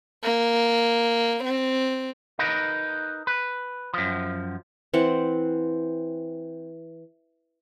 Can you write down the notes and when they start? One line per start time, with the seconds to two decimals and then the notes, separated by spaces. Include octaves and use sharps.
0.24 A#3
1.44 C4
2.39 D#4 A#4 B4
3.27 B4
3.94 F#2 F3
4.94 E3 C4 F#5